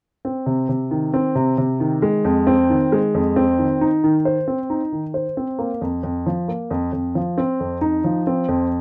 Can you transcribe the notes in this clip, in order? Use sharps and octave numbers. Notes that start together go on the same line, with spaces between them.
C4
C3
C3
D#3
C4
C3
C3
D#3
G#3
F2
C4
D#3
G#3
F2
C4
D#3
D#4
D#3
C5
C4
D#4
D#3
C5
C4
A#3
F2
F2
F3
A#3
F2
F2
F3
C4
F2
D#4
F3
C4
F2